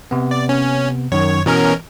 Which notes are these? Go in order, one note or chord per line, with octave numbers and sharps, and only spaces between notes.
C3 B3
D5
C#4
F#2 D#3 C#5
B2 E3 C#4 A#4